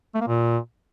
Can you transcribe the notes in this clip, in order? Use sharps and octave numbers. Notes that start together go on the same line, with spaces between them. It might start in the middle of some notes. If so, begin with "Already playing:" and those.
A3
A#3
A#2